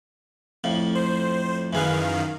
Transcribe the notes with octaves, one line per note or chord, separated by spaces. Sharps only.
F2 A2 F3
C5
F#2 D#3 E3 G#4 B4 F5